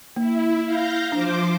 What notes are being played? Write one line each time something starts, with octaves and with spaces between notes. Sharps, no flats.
A#3 E4
F5 G6 A#6
F3 D4 C5 D6